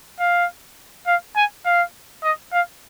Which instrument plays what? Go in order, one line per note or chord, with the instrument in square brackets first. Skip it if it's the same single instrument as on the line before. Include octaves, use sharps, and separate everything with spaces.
[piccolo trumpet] F5
F5
G#5
F5
D#5
F5